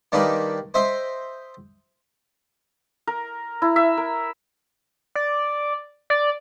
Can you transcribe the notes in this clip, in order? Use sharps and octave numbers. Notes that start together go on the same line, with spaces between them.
D#3 G3 A#3 D4 D#4 B4
C5 D#5 E5 G5 C6
A#4
E4
E5
A#4
D5
D5